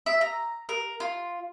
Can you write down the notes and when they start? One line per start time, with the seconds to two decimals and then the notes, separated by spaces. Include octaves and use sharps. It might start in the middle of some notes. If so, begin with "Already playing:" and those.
0.06 E5
0.21 A#5
0.69 A#4
1.00 F4